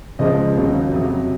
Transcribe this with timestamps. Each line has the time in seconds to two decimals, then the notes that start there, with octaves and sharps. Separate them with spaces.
0.19 C#2 C#3 F3 G#3 D#5
0.56 D#2 C#3 F#3
0.91 F2 C3 F#3